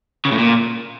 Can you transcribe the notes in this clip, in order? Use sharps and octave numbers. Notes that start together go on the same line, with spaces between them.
C#3
A2
A#2